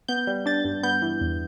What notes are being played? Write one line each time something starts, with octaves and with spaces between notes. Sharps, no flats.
B3 G6
G3
D4 A6
G2
B3 G6
E3
E2